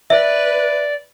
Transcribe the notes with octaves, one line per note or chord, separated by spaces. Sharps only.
B4 D5 E5